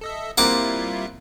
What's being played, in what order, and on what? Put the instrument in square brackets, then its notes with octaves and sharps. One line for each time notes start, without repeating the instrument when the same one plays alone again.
[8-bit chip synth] A4 D#5 E5
[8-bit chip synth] G3 E4 F4 [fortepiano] A#3 C4 [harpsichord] F#5 D6